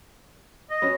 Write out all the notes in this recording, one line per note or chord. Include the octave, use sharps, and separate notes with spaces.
D#5
B3 C#4 F#4